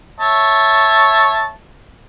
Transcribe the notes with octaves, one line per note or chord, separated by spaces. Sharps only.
C#5 E5 A5